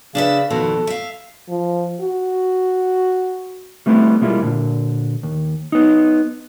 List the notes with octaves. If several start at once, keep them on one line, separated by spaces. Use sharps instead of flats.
C#3 D4 B4 E5
F2 B2 D#3 A4
E5 F5
F3
F#4
G3 A3 B3 C4 E4
B2 G3 G#3 A#3 E4 F4
A#2 D3
D#2
B3 D#4